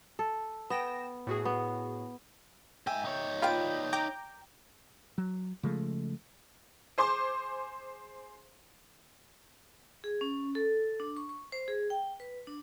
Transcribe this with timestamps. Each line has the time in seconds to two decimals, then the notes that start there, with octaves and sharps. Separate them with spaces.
0.19 A4
0.70 B3 G5 A#6 E7
1.27 A2 F#4 G#4
1.45 B3
2.87 G#2 E5 G5 G#5
3.05 D#4 C#5
3.42 F4 B4 D5 G5
3.93 G5 A#5 D6 G6
5.18 F#3
5.63 C#3 F3 G#3 A3
6.98 G#4 C5 C6 D6
10.04 G#4
10.21 C#4
10.55 A4
11.00 D4
11.17 C#6
11.29 C#6
11.52 C5
11.68 G#4
11.90 G5
12.20 B4
12.47 D4